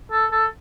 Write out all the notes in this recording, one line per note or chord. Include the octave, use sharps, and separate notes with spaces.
A4
A4